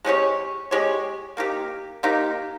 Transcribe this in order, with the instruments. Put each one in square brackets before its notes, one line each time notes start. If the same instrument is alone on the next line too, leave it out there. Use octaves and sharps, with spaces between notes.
[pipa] G#3 C#4 G4 C#5
G#3 C#4 G4 C#5
A#3 D#4 G4
A#3 D#4 G4